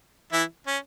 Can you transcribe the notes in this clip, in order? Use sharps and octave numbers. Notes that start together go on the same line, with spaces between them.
E3 E4
C#4